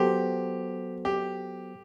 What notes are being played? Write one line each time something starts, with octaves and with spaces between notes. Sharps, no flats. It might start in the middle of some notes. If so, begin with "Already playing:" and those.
Already playing: F#3 B3 F#4 G4 A4 C5
G4